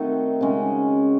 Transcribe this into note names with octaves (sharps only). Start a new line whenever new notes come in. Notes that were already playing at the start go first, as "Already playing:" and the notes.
Already playing: D#3 A3 C4 D#4 F#4
C#3 G#3 C#4